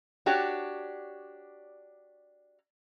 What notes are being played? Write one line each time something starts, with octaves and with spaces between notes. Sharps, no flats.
D4 F#4 G4 C#5 D5